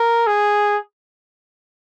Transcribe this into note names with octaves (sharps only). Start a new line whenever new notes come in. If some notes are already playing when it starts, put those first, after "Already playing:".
Already playing: A#4
G#4